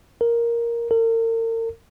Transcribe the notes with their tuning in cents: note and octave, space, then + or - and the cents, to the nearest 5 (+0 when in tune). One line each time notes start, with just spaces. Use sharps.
A#4 +5
A#4 -40